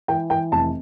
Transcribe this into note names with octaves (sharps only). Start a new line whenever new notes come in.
E3 G5
E3 G5
F1 A5